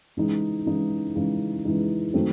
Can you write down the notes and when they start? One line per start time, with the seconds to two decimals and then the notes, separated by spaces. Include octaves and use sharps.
0.17 C#3 E3 G#3 D#4
0.66 C#3 E3 G#3 D#4
1.15 C#3 E3 G#3 D#4
1.65 C#3 E3 G#3 D#4
2.14 D#3 F#3 A3 C4